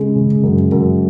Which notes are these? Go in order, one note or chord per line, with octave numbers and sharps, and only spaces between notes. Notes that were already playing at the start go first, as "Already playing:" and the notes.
Already playing: C#3 G#3
C#3
F#2
F#2